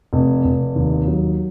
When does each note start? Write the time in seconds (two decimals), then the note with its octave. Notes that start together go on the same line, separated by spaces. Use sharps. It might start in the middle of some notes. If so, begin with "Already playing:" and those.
0.13 F1
0.44 F1
0.76 D#2
1.08 F#3